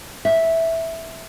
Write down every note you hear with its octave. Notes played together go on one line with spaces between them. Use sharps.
E5